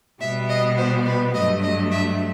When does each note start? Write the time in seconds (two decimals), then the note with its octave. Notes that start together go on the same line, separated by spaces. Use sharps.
0.20 B2 G3 B3 E5
0.49 D#5
0.77 C5
1.05 B4
1.34 G2 F#3 A3 D#5
1.62 D#5
1.91 E5